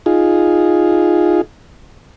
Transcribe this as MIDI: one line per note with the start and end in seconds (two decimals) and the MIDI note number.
0.06 1.41 63
0.06 1.41 65
0.06 1.41 68